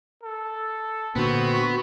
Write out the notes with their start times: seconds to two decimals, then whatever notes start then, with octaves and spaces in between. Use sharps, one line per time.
0.23 A4
1.16 A#2 D3 B3 C4 F#4